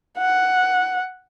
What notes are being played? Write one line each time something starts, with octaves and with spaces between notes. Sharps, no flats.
F#5